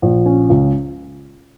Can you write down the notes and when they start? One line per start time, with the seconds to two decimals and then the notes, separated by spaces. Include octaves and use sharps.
0.02 A#1
0.26 C#4
0.50 C#2